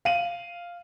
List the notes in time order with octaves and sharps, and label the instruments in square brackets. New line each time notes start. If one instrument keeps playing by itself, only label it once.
[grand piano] F5 D#7 F#7